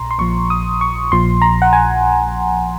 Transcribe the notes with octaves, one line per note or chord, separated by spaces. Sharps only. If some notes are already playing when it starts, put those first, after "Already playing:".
Already playing: A#1 A#2 A#5 C6
C6
A#1 A#2 F3 C#6
D#6
C#6
A#1 A#2 F3 C6
A#5
F#5
G#5